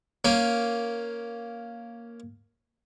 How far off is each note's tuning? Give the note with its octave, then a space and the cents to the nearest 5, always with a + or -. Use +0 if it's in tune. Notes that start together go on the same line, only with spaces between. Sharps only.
A#3 +0 C#4 +0